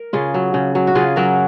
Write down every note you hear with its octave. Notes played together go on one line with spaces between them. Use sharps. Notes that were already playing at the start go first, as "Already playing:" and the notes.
Already playing: A#4
C#3 F4 G#4
F#3
C#3
F#3
F#4
C#3 F4 G#4
F#3 F#4 A#4